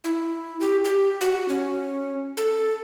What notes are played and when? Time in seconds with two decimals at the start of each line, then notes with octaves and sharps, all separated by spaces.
0.04 E4
0.60 G4
0.85 G4
1.21 F#4
1.48 C#4
2.37 A4